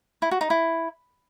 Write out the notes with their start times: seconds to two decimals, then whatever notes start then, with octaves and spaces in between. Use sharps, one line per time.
0.22 E4
0.31 F#4
0.41 D#4
0.50 E4